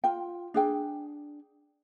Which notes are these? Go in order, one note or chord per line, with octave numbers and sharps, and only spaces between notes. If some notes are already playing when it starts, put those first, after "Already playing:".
F4 G5
D4 G#4 G5